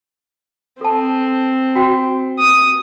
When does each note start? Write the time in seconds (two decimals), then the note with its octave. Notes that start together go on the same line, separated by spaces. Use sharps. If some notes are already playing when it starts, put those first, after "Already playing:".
0.81 C4 A4 A5
1.75 F#4 G5
2.38 D#6